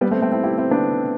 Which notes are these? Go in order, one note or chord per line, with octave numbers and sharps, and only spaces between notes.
G3 B3
A3 C4
A3 C4
C4 E4
E4 G4
C4 E4
B3 D4